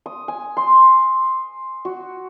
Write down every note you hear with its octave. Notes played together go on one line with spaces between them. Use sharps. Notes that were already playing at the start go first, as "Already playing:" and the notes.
D#6
G#5
C6
F#4